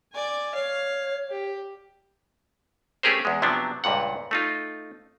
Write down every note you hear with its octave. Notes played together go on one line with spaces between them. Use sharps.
D5 G#5
C#5 F5
G4
A3 C#4 G4 G#4 A#4 C5
E2 G#3
C3 F3 F#3 B3 D4
C#2 G2 A#2 F#5
A3 D#4 F4